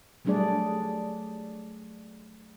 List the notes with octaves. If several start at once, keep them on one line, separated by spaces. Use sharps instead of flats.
F#3 G3 A3 D4 G#4 D5